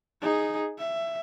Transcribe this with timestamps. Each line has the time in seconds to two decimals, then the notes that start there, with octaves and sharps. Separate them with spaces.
0.21 D#4 G#4
0.78 E5